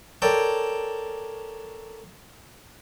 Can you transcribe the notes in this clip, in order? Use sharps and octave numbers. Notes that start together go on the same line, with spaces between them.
A4 A#4 C#5 D5 G5 A5